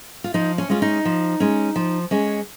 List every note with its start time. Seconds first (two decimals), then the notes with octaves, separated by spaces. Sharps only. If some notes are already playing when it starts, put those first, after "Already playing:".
0.24 F4
0.34 F3 D#4
0.58 C#4
0.70 G#3 C#4 F4
0.82 D#4
1.05 F3
1.40 G#3 C#4
1.76 F3
2.11 G#3 C#4